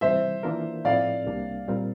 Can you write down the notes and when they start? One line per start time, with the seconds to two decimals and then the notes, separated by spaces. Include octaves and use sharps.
0.01 C3 E3 G3 C5 E5
0.43 E3 A#3 D4 F4 A#4
0.85 A2 F3 A3 C4 E4 D5 F5
1.26 C2 C3 G3 A#3 D4
1.68 A#2 G3 C4 F4 A#4